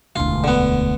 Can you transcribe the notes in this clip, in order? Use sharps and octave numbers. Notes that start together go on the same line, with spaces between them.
E1 D2 F4
D3 B3